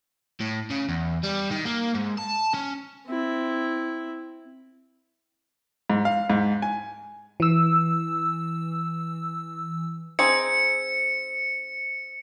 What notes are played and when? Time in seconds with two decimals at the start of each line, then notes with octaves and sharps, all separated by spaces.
0.40 A2
0.70 C#3
0.89 E2
1.24 G3
1.51 D#3
1.66 A#3
1.95 G#2
2.18 A5
2.54 C#4
3.07 C4 E4
5.90 G#2
6.05 F5
6.30 G#2
6.62 G#5
7.40 E3 E6
10.19 C4 D#4 G#4 C#7